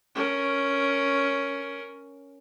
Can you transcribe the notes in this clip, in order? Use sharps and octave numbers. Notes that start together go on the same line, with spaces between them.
C#4 A#4